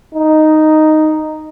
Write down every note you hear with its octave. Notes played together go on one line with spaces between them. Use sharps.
D#4